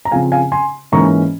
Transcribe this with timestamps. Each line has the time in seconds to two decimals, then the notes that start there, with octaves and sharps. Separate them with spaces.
0.05 A#5
0.11 C#3 F3 C4 F5 G#5
0.32 F5 G#5
0.52 G#5 C6
0.92 G#2 E3 A#3 C#4 A#5 C#6